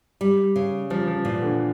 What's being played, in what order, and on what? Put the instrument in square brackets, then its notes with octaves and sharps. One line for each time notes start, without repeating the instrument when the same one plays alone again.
[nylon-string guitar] G3
C#3
[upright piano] F3 [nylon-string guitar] G3
[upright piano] F3
[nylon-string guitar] A#2 [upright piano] E3
[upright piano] D3